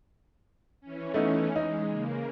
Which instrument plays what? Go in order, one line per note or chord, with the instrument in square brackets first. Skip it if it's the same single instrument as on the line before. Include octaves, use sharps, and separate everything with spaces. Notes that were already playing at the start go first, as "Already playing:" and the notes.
[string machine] E3 C#4
[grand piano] A3 B3 D#4
[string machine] G#3 [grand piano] D#4
[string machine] C#3 A#3